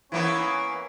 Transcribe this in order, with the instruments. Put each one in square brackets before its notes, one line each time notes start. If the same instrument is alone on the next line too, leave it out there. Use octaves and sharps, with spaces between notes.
[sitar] E3 A#3 B3 [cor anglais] C#4